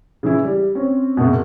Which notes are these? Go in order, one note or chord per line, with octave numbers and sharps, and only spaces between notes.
C#3 E3 E4
G3
C4 C#4
F#1 B2